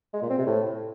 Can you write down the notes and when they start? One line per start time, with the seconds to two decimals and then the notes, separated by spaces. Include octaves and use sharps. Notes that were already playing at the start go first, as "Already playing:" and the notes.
0.14 G#3
0.22 A#2
0.30 C4
0.38 C3
0.46 A2